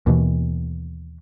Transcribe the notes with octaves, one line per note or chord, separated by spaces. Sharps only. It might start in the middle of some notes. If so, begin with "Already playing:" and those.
D#2 B2 E3